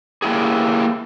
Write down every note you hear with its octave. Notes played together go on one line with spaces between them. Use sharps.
A#3 E4 G4 G#4